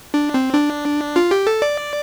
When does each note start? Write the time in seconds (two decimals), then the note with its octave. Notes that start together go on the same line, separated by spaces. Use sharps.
0.14 D4
0.34 C4
0.54 D4
1.16 F4
1.31 G4
1.47 A4
1.62 D5